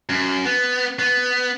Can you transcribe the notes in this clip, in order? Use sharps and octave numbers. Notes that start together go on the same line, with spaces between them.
F#2
B3
B3